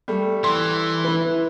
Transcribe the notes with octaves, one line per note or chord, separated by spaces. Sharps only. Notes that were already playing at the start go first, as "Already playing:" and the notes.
G3 A3
E3 C6
E4 B4